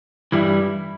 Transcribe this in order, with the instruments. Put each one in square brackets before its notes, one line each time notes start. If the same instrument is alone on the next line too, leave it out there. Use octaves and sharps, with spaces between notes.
[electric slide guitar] G2 E3 G3 E4